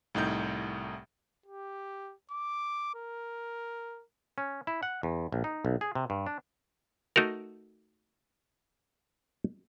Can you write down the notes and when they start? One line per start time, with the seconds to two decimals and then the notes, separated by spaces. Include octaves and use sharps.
0.15 C2 A2 D#4 G6
1.46 G4
2.31 D6
2.95 A#4
4.38 C#4
4.67 E4
4.83 F#5
5.03 E2
5.32 A#1
5.44 D#4
5.65 B1
5.81 G#4
5.95 C3
6.10 G2
6.27 D4
7.16 A3 D#4 F#4 A#4